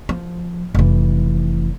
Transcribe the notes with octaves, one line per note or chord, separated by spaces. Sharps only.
F3
F1 E3